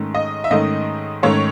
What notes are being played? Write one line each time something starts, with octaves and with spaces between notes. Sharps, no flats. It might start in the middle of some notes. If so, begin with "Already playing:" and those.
Already playing: G#2 D#3 A3 C#4
D#5
E5
G#2 D#3 A3 C#4 D#5
G#2 D#3 A3 C#4 C#5